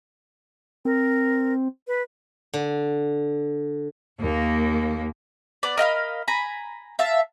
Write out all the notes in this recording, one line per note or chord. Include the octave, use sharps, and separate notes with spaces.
C4 A#4
B4
D3
D#2 A#3
B3 D5
A#4 D#5 F5 B5
G#5 A#5 B5
E5 F5 A5